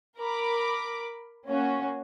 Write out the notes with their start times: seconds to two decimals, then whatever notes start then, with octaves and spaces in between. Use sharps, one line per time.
0.18 A#4 B5 D6
1.48 A#3 C#4 F#4